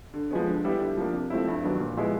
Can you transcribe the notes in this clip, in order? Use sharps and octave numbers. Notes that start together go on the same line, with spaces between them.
D3
F3 G#3 B3
D3
G3 B3 E4 G4
D3
F3 A#3 D4
C3
F3 A3 C4 E4
G2
D#3 F#3 B3 D4
A#2
F3 G#3 B3 E4